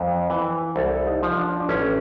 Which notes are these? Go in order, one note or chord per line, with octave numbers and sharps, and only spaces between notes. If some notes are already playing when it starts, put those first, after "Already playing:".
Already playing: F2
E3 B4
C2 A4
D#4
F3
D4
D4
A1 C#4